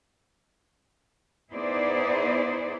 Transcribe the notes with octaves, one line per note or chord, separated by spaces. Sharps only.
B3 D#4 E4 G#4 C5 D5